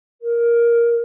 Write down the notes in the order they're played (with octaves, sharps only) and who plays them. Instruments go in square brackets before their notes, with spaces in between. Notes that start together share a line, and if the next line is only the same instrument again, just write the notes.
[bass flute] A#4